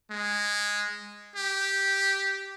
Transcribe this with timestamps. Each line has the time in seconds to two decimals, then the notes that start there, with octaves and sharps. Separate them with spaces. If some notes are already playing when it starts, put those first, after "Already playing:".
0.11 G#3
1.36 G4